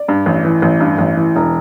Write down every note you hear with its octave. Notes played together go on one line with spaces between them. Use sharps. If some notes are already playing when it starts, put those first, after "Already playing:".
Already playing: D5
G2
A1
E3
A1
G2
A1
E3
E1